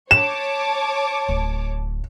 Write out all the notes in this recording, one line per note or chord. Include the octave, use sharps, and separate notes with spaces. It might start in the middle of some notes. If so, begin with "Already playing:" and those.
C#5 A5 D6 E7
D1